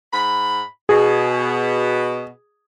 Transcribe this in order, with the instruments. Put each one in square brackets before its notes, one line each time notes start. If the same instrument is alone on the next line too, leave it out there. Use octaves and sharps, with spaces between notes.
[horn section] G#2 B5
[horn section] B2 [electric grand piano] G#4